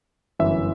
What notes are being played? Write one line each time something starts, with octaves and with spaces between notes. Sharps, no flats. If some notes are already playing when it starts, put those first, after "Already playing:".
G1 F#2 E3 E5